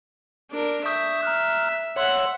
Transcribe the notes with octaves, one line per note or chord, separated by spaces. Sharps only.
D4 A#4
E5 C#6 D#6 G6
A#5 F6 F#6
C#5 E5 F#5 C6 E6